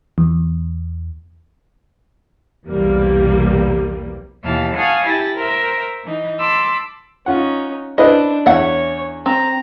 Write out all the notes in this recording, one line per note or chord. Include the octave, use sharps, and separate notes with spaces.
E2
B1 E2 C3 G3 A#3
D#2 B2 E3 F5 A5
F5 F#5 G#5 A5 C#6 D#6
E4 G4 A6 A#6
A#4 C5 E5
E3 D#4
A5 B5 C6 D6 E6
C#4 D#4 F4 F#5
D4 E4 B4 C5 D#5
E2 C#5 E5 F#5
C4 A#5